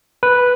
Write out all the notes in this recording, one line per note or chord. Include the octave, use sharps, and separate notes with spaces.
B4